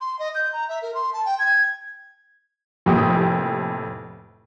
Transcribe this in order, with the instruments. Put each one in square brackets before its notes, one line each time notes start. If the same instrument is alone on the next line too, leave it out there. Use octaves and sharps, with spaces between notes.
[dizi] C6
D#5
G6
A#5
E5
A#4
C6
A5
G5
G#6
[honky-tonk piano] F1 F2 A2 A#3 G4 D#6